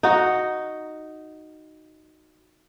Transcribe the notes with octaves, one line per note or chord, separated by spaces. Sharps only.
D#4 F#4